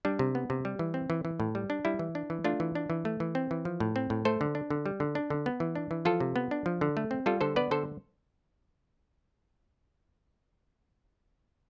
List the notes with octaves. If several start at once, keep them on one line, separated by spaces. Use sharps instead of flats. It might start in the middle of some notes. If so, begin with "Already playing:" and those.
G3 D4
C3
B3
C3
G3
E3
C4
E3
E3
A2
G3
D4
G3 E4
E3
D4
E3
A3 D4 F4
E3
D4
E3
A3
E3
C4
E3
F3
A2
C4
A2
A3 A4 C5
D3
D4
D3
G3
D3
D4
D3
B3
E3
D4
E3
F3 F4 A4
C3
B3
D4
F3
D3
A3
C4
G3 F4 A4
D3 A4 C5
B3 B4 D5
D3 A4 C5